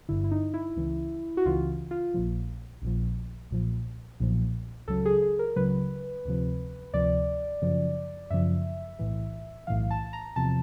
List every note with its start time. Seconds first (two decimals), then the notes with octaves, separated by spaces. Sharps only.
0.09 G1 G2 D3 E4
0.24 E4
0.31 D#4
0.54 E4
0.76 C#2 C#3 E3
1.37 F#4
1.46 C#2 C#3 E3 F4
1.91 F4
2.14 A#1 A#2 F3
2.82 A#1 A#2 F3
3.51 B1 A#2 F3
4.20 B1 A#2 F3
4.88 C#2 C#3 F#3 A4
5.05 G#4
5.22 G#4
5.39 A#4
5.56 C#2 C#3 F#3 B4
6.25 D2 C3 F3
6.93 D2 C3 F3 D5
7.62 F#2 C#3 F3
8.30 F#2 C#3 F3 E5
8.99 B1 A2 E3
9.67 B1 A2 E3 F5
9.91 A5
10.13 A#5
10.36 E2 C3 F3 A5